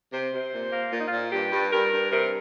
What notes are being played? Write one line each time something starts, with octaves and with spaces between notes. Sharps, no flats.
C3 C5
C3
A#2
A#3
A#2 F4
D#4
A#2 F4
G2 G4
G2
G2 A#4
G2
C3 A#4